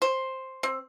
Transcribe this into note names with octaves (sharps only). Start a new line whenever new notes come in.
C5
C4